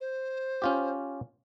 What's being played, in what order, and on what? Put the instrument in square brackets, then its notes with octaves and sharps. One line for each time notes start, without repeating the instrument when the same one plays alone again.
[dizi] C5
[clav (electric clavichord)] C#4 F4 G4